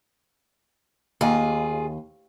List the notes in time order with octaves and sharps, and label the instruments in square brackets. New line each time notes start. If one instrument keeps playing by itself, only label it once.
[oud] D#2 [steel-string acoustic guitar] F4 G#4